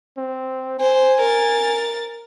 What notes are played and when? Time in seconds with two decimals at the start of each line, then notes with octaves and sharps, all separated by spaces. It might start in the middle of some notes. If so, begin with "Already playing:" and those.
0.18 C4
0.80 C5 G#5
1.21 A#4 A6